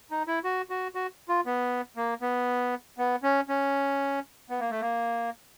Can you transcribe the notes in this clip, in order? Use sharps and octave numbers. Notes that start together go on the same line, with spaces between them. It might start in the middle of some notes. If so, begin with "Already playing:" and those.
D#4
E4
F#4
F#4
F#4
F4
B3
A#3
B3
B3
C#4
C#4
B3
A#3
A3
A#3